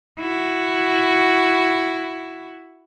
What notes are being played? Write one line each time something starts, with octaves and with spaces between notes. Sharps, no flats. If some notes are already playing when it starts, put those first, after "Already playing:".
E4 F#4